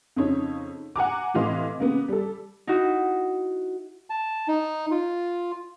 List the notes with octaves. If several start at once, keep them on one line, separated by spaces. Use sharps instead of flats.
F2 C#3 D#4 C#5
F#5 G#5 A#5 D6
A2 C3 E3 D#5 F5 C6
C#3 A#3 B3
G3 A4
D#4 E4 F#4
A5
D#4
F4